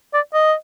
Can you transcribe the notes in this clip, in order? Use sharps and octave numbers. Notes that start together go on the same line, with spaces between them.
D5
D#5